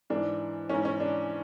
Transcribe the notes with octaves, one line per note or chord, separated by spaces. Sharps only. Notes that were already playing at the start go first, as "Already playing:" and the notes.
G#2 E3 D4
G#2 E3 C#4
C#4
D4